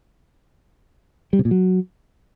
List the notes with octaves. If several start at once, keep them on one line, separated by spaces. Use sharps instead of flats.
G3
C3
A#2
F#3